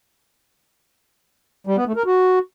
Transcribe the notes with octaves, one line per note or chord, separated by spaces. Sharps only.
G3
B3
A3
A#4
F#4